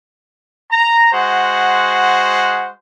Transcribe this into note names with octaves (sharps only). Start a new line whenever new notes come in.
A#5
G#3 F#4 C5 F#5